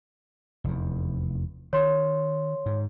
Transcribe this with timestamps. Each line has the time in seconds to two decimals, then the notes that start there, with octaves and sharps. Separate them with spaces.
0.64 F1 E2
1.73 D#3 C#5 C6
2.66 G#2